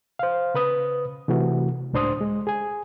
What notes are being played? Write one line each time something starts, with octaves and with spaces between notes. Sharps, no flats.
C5 F5
C#3 B4 D#6
C3 E3 A3 F#4
C#2 A2 D4 C5 C6 D#6
G#3
G#4 G#5